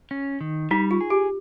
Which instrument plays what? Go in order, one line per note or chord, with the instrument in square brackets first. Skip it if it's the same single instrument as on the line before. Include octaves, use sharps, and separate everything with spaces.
[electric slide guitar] C#4
D#3
[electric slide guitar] G3 [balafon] D#4
[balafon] F4
[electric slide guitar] G#4
[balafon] G4